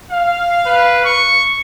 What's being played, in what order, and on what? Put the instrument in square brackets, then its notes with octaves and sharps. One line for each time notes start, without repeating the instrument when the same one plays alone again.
[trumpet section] F5
[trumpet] B4
C#6